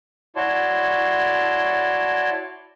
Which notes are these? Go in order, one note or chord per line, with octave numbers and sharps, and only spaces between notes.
E4 F#4 C#5 D5 A5 C6